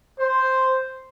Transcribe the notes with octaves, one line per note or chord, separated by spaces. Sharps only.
C5